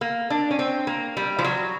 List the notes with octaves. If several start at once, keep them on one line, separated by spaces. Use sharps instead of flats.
A#3
D4
C#4
C4
A#3
G3
F3
F#3